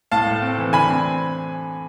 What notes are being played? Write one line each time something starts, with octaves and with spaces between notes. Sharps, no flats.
A2 F5 A5
A3
C4
E3
D3 G#5 B5
C4